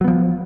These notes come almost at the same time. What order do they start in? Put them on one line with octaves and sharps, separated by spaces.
F#3 B3 F3